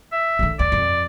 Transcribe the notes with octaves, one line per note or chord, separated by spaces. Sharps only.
E5
D3 E3
D2 D5
F2